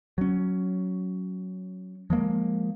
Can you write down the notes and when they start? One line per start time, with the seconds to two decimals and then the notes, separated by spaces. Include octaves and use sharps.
0.18 F#3 C#4
2.10 F3 G#3 A#3